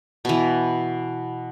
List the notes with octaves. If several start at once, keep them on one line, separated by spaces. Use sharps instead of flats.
B2 E3